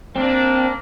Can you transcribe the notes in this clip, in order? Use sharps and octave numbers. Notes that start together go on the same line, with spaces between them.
A#3 C4 D4